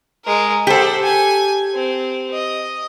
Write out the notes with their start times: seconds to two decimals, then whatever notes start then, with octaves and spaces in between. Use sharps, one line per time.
0.25 G#3 A#4
0.67 G4 A4 C5 F#5
1.03 G#5
1.75 C4
2.33 D#5